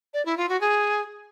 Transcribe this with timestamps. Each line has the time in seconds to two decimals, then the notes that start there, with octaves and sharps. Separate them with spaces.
0.14 D5
0.25 E4
0.37 F4
0.49 F#4
0.61 G#4